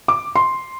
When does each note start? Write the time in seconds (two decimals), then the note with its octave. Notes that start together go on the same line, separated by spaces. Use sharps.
0.08 D6
0.36 C6